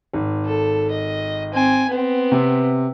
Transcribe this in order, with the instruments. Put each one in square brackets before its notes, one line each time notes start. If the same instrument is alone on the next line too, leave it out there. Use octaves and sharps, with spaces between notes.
[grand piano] G#1
[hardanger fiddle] A4
D#5
C4 G#5
B3 C4
[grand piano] C3